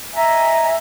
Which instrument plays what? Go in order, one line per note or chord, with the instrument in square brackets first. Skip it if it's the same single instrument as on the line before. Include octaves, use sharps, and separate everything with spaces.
[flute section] D#5 E5 G#5 A#5